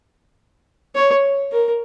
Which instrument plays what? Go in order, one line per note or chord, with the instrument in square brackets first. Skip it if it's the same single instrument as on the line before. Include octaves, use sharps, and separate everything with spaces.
[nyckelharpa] C#5
A#4